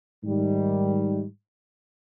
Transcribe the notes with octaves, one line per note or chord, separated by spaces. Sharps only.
G#2 D#3 G3